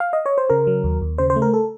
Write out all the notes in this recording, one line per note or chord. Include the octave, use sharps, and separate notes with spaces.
F5
D#5
C#5
C5
C#3 A#4
F#3
D#2
D#2
C#3 C5
C5
A3
A#4
A4